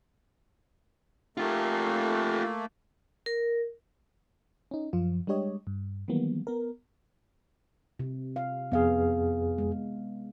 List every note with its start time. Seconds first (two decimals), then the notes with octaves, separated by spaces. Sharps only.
1.37 A3 A#3 F4 G4
3.26 A#4
4.71 C#4 D#4
4.93 F#2 F3 F4
5.27 G3 G#3 D4 G4 C#5 D#5
5.67 G2
6.08 D#3 E3 F#3 G3 A#3 B3
6.47 B3 A#4
7.99 C3
8.36 F5
8.72 F2 B3 G#4 F5
9.58 G#3